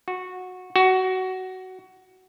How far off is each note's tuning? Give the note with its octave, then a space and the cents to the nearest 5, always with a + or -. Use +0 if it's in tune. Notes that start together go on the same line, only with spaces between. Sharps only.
F#4 -15
F#4 +15